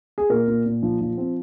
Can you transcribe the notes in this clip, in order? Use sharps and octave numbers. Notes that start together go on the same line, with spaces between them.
G#4
A#2 A#4
A#2
A#2
F3
F3
C4